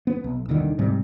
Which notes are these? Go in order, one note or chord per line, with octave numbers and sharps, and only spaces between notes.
B3
B1
D#1 C2 D3 D#3
G#2 C3 G3